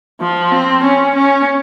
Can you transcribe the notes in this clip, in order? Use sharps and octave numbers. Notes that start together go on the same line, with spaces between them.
F3
C4
C#4
C#4